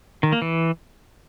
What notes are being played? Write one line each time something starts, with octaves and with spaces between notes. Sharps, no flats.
D#3
A#3
E3